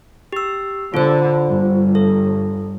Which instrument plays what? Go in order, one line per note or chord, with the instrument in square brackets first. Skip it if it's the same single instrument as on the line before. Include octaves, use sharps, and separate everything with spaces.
[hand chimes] G4 E6
[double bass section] D3 [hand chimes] F4 C5
[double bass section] G1
[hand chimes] A4